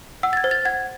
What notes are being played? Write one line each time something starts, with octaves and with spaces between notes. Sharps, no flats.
F#5 E6
A6
G#6
C5
A6
F#5 G#6